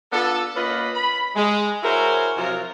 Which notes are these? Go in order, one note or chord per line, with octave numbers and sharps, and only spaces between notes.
B3 D4 F4 A4
A#3 C#4 F4 B4 D#5 B5
B5
G#3
E4 F#4 G#4 A#4 C5 C#5
C3 F3 F#3 F4 A#4